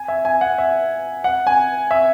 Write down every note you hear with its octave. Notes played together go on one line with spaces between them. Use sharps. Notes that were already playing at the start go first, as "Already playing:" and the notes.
Already playing: G#5
E5
G#5
F#5
E5
F#5
G#5
E5